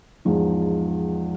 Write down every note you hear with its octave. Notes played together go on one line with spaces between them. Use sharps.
E2 G#2 F3 D#4